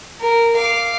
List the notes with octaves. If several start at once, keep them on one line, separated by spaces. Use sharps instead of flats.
A#4
F5 D6